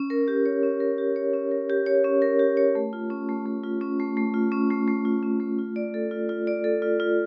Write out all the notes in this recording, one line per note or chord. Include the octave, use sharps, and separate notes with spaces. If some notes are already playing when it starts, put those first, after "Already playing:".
Already playing: C#4
A#4
G4
C#5
C#4
A#4
G4
C#5
C#4
A#4
G4
C#5
C#4
A#4
G4
C#5
A3
F4
C#4
A3
A3
F4
C#4
A3
A3
F4
C#4
A3
A3
F4
C#4
A3
F4
D5
A4
F4
F4
D5
A4
F4
F4